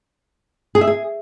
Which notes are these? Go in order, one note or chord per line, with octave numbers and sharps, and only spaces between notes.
G#4
E5
G#4